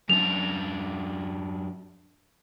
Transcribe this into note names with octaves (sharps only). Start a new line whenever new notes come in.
F#2 D4 F7